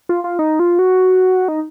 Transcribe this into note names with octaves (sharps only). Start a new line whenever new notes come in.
F4
F4
D#4
F4
F#4
D#4